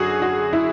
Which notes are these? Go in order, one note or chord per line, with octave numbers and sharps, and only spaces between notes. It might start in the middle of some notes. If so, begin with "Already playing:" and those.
Already playing: F#2 D3 F#4 G#4
F#4
E4